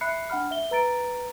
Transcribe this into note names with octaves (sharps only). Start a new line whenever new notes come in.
E5 B5 F#6 C7 C#7
D4 F#5 B5 F6
E5 G7
B4 A#5 A6 D7